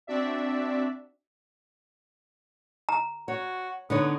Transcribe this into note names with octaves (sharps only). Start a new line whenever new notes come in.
C4 D4 F#4 D5 E5
A#5
F#4 C#5
D3 B3 D#4 C#5